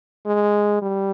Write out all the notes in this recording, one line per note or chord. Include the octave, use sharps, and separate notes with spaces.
G#3
G3